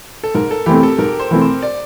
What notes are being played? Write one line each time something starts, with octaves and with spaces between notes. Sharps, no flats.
A4
G#2 A#4
A4
E3 A3 C4 G4
A4
G#2 A#4
C5
E3 A3 C4
C5
D5